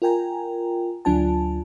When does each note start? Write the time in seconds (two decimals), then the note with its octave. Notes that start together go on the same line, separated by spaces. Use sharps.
0.02 F4 A#4 G5 G#5 A#5
1.05 D2 F#3 D4 F4 G#5 A5